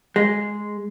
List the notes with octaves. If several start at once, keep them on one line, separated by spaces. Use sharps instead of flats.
G#3